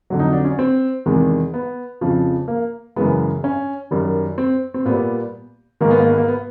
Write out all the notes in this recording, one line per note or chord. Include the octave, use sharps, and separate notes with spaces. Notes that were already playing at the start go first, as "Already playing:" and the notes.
F2 D3 F#3
D#4
D4
C#4
C4
E2 C3 D#3 G#3
B3
F2 C#3 F3
A#3
F#2 C#3 E3 G#3 B3
C#4
F#2 D#3 G3
C4
C4
A#2 G3 B3
G#2 D#3 G#3 A#3
B3
A#3
B3
A#3
B3